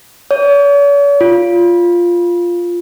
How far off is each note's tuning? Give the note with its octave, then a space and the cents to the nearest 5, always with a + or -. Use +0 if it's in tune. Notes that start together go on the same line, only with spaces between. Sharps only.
C#5 +45
F4 -5